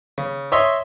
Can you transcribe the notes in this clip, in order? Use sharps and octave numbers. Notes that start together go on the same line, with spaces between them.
C#3
C#5 D#5 E5 C6